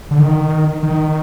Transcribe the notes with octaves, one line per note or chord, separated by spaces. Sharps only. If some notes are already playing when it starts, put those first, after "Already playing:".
D3
D#3
D#3